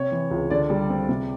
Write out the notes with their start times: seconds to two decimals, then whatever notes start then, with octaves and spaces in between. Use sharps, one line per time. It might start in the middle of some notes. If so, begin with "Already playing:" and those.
Already playing: C3 C#5
0.12 E3
0.31 C#2
0.50 D3 D5
0.70 G3
0.90 C4
1.09 C3